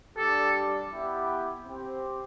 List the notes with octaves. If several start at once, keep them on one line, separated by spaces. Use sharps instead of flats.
G3 D4 G4 A4
B3 E4 G4
C4 G4